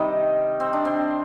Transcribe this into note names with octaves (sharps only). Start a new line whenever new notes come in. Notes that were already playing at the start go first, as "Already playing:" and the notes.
Already playing: C3 D#3 G3 D#4
C4
D4
C4